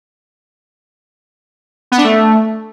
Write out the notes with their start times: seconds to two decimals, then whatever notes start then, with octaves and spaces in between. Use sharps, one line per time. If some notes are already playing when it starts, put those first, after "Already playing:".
1.92 B3
1.98 D4
2.04 A3